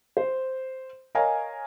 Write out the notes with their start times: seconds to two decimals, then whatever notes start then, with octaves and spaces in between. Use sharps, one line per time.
0.17 C5
1.15 A#4 C#5 D#5 F5 G#5 A#5